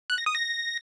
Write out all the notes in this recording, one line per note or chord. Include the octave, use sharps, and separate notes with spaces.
F#6
A#6
D#6
A#6